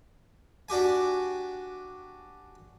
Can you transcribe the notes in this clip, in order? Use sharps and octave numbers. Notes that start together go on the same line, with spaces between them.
D4 F#4 G4 G#5